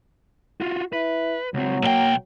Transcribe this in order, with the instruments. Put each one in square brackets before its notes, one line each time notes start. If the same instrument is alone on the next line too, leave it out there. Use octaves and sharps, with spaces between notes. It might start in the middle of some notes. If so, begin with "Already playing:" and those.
[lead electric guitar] F4 F#4
[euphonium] E4 [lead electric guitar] B4
[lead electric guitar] C#2 C4 [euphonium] F#3
[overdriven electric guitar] B1 G5 [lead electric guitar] A#3